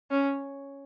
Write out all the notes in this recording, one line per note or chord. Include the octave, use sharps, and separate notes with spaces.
C#4